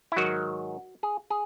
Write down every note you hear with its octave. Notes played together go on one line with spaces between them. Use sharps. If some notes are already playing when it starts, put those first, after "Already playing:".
E4
G#2 D#3 F#3 F#4
G#4
G#4